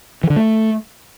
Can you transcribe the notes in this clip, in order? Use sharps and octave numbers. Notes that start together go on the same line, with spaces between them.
E3
D3
A3